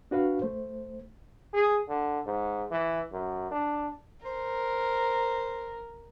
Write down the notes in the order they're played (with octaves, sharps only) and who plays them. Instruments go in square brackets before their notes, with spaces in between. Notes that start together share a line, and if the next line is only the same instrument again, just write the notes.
[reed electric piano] D4 F#4 B4 F5
A3 C5
[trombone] G#4
D3
G#2
E3
F#2
D4
[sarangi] A#4 [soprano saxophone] C5